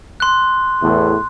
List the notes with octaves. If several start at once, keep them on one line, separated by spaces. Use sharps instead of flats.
C6 F#6
E2 A2